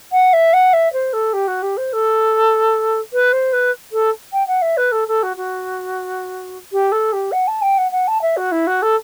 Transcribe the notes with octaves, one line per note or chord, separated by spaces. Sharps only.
F#5
E5
F#5
E5
C5
A4
G4
F#4
G4
C5
A4
B4
C5
B4
A4
G5
F#5
E5
B4
A4
A4
F#4
F#4
G4
A4
G4
F#5
A5
G5
F#5
F#5
A5
E5
F#4
E4
F#4
A4